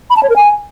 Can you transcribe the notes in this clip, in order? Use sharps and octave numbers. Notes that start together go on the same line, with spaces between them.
B5
A5
C#5
A#4
G#5